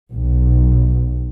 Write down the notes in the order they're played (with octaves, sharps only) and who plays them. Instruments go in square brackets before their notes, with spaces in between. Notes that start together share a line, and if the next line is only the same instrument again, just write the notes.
[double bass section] B1